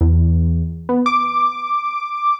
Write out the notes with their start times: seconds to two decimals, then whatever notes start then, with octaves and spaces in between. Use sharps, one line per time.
0.01 E2
0.89 B3
1.06 D6